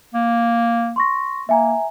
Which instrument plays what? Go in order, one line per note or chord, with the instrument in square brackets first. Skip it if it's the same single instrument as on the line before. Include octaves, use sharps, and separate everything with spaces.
[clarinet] A#3
[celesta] C6 C#6 A#6
[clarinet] A#3 [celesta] E5 G#5 A#5